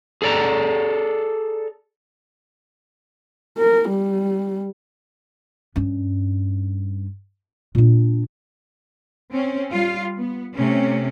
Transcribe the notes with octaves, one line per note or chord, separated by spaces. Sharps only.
G#4 A4 D5 A#5
A#4
G3
G2 C#4
A#2 D4
C4 C#4
G3 F4
B3
C3 A3 C#4